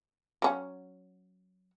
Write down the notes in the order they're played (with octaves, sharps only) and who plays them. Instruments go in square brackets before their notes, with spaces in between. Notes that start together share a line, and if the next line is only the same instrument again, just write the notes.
[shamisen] F#3 C#4 F#5